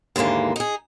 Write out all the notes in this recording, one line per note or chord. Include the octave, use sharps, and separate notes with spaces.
D#2 G#2 D3 E3 A#3
D#4 G#4